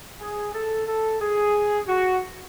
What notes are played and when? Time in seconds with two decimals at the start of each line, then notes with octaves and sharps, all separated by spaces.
0.20 G#4
0.53 A4
0.87 A4
1.21 G#4
1.87 F#4